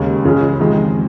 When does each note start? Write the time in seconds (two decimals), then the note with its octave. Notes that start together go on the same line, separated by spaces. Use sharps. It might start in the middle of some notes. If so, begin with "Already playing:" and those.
Already playing: D#2 C#3 G#3
0.25 C#2 C#3 G#3 C#4
0.59 F2 D#3 G#3